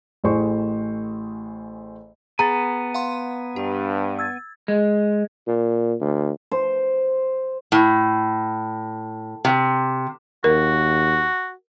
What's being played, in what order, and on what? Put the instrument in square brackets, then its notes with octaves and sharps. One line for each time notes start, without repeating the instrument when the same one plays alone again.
[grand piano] A1 A2 G#4 C5 C#6
[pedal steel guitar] B3 G#5 [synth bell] G#4 A6 [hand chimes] A#5
[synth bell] F5 F#5 C6
[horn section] G2 [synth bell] G4
[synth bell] E6 G#6 A6
[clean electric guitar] G#3
[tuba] A#2
D2
[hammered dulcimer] C5
[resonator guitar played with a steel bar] A2
C3
[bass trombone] D#2 [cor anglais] F#4 [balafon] A#4